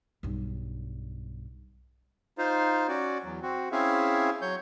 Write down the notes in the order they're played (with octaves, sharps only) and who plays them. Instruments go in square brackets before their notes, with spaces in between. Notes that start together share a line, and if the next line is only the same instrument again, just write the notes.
[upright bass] B1 G2
[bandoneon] D#4 F4 C5
C#4 F#4 D5
E2 F#3
C4 F#4
C4 C#4 E4 G#4 E5 F5
F#3 C#5 G6